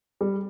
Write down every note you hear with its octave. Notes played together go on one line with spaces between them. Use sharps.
G3